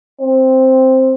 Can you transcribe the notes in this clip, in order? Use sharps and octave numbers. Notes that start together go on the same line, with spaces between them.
C4